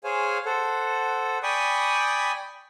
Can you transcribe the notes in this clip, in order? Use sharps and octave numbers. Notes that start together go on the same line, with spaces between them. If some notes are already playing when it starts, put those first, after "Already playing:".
G#4 C5 C#5 F5 G#5
A4 C5 F#5
D5 G5 G#5 B5 C#6 D#6